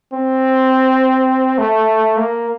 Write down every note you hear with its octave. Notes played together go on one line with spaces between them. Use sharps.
C4
A3
A#3